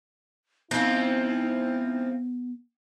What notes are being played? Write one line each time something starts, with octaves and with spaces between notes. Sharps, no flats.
G#2 F3 B3 C4 E4